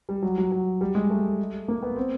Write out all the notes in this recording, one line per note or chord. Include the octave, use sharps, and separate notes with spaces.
G3
F#3
F#3
F#3
G3
G#3
A3
A#3
B3
C4